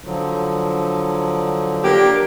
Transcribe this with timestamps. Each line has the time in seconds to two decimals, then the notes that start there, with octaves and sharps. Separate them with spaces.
0.04 D3 F3 F#3
1.83 A#3 D4 G4